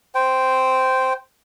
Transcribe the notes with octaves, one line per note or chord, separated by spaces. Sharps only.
C5 G5